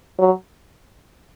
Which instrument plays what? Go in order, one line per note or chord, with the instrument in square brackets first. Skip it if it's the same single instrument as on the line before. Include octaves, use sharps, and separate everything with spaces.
[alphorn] F#3